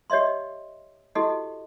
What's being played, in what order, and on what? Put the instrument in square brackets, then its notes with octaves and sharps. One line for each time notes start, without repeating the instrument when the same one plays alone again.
[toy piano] G4 C#5 D#5 E5 C6
E4 F#4 G4 A4 D#5